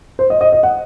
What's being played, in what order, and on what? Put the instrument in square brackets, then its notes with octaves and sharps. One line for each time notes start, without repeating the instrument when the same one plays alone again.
[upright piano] C5
D#5
D#5
D#5
F#5